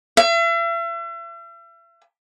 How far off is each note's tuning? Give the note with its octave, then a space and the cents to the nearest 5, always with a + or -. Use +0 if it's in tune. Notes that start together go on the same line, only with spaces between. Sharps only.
E5 +40